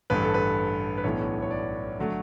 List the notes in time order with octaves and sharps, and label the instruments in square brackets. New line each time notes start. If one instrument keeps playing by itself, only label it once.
[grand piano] A1 G2 D3 B4
A4
B4
B4
B1 A2 E3 B3 D4 C#5
C#5
D5
D3 F#3 A3